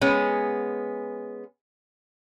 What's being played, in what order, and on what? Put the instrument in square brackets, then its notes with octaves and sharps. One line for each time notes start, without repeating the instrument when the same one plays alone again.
[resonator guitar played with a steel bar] G#3 B3 C#4